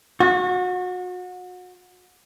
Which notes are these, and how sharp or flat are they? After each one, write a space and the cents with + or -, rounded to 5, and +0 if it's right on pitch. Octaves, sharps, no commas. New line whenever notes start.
F#4 -30